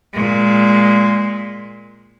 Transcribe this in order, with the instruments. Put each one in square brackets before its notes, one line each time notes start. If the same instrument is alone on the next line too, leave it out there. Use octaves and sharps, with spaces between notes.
[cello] A#2 G#3